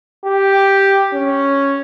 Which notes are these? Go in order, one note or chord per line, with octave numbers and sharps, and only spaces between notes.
G4
C#4